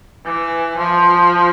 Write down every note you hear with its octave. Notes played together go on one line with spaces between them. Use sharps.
E3
F3